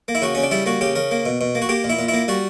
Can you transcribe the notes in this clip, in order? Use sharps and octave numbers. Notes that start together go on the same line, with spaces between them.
A#3
E4
C#3 F#4
C#3 C#4
D4
G3 E4
A#3 F#4
C#3 G4
C#3 A#4
A#3
B2
B2
A#3
F#4
A#3 G4
A#2
E4
A#2
E4
A#3
G3 F#4